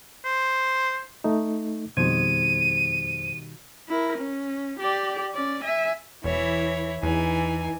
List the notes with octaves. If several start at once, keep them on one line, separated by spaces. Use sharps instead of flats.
C5
A3 D#4
F2 B2 D#3 G3 C5 G#6 D#7
E4 A#4
C#4
G4 D5
C#4 D5
E5 G#5
E1 E3 E4 C#5
E2 E3 D#4 G#5